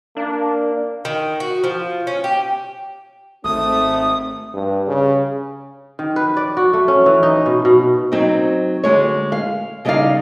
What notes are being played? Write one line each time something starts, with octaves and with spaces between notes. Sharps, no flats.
A#3 D4
D#3
F#4
F3
C#4
G4
G#1 A3 C4 D#6
G2
C#3
D#3
B4
D5
F#4
A3
C#4
E3
D#4
B2
B2
F#3 C4 D#4
D2 G2 G#3 C#5
F5
C#3 G3 D#4 C5 D5 F5